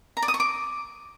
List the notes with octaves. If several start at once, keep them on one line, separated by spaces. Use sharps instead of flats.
A#5
D5
D#6
C#6
D6